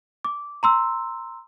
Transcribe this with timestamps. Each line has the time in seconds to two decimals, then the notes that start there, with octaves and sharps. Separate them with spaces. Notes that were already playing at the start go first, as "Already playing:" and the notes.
0.25 D6
0.63 A#5 C6 E6